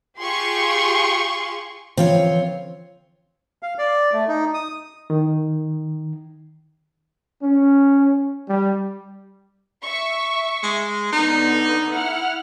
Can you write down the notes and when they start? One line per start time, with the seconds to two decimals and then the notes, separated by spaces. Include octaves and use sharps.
0.20 F4 G4 G#4 C6 C#6
1.97 D3 E3 F3 C4 F4 C#5
3.63 F5
3.78 D5
4.13 A3
4.28 D#4
4.54 D#6
5.10 D#3
7.42 C#4
8.48 G3
9.83 E5 C#6
10.63 G#3
11.13 D3 B3 D#4
11.90 E4 F#5 F6